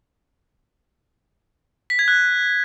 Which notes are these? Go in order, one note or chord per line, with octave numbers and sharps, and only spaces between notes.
B6
G#6
F#6